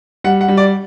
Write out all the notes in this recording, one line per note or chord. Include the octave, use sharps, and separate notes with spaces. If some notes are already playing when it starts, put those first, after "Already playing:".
G3 F#5
F#5
G3
D5